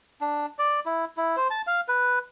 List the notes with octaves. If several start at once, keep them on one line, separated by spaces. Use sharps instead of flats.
D4
D5
E4
E4
C5
A5
F5
B4